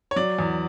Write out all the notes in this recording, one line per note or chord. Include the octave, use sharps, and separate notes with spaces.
C#5
F#3 D5
E2